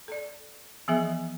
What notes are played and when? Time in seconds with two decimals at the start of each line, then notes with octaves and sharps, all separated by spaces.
0.08 A4 D5
0.88 E3 F3 B3 G#4 E5 G#5